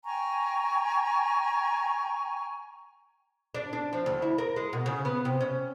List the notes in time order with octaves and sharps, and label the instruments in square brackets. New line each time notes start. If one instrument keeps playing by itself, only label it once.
[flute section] G5 G#5 A#5 C#6
[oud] D4
D4
F3
D2
E4
A#4
G#3
B2
C#3
B3
C3
C#4